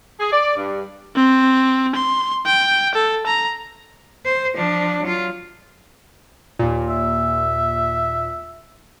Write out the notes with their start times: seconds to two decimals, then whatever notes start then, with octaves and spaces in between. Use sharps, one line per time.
0.20 G#4
0.32 D5
0.56 G2
1.16 C4
1.95 C6
2.46 G5
2.95 A4
3.26 A#5
4.25 C5
4.55 F3 D4
5.03 F#3 F4
6.59 D#2 A#2
6.90 E5